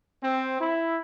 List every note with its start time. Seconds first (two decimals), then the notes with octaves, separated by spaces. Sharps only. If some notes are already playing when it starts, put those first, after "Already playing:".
0.24 C4
0.61 E4